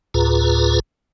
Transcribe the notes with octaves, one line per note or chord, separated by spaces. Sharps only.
D2 A2 F4 G#4 B4 A#5